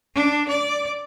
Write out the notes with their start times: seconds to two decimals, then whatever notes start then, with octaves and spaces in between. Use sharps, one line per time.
0.15 D4
0.48 D5